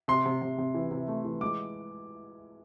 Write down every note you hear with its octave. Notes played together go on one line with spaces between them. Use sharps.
C3 C6
C3
C3
C3
E3
C3
A3
E3
G#3 D6